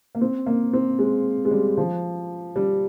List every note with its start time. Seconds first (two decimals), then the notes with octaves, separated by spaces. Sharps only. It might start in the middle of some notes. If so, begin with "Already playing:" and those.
0.15 A#3
0.21 C4
0.46 A#3
0.73 C4
0.99 G#3
1.45 G#3
1.51 G3
1.77 F3
2.56 G3